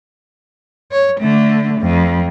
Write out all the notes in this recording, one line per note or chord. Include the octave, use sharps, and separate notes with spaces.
C#5
D3 A3
F2